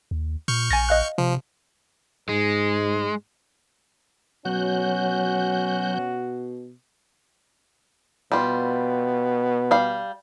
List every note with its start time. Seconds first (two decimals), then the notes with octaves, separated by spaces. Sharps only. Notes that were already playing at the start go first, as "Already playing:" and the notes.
0.11 D#2
0.48 A#2 C#6 F6 G6
0.71 A#1 G#5 A6 A#6
0.89 D#5 F5 F#6
1.18 C3 F3
2.29 G#2 G#3
4.45 B2 F#3 C#4 F#4 F#6 G6
8.32 B2 G3 F4
9.71 G3 F5